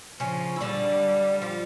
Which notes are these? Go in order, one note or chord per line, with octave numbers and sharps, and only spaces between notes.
C#3 F3 C#4
E4
D3 G3 D4
F3 F4